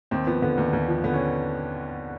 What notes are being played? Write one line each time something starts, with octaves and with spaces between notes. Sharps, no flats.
D#2 C4
F3 B3
D3 B3
D#2
D#2
F3
D3 B3
C#4